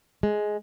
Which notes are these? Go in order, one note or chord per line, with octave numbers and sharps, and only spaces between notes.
G#3